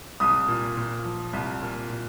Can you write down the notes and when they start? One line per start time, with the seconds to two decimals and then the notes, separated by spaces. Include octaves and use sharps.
0.20 C2 D#6
0.48 A#2
0.77 A#2
1.05 F3
1.33 C2
1.62 A#2
1.90 A#2